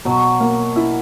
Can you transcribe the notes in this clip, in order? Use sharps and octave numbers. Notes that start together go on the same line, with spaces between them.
B2 F#3
A#3
E4